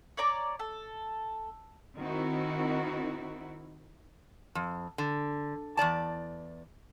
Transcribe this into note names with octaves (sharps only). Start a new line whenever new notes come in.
C#5 D5 A#5 D6
A4
D#3 C4 D#4 E4 F#4
F2
D3
E2 F3 D5 A5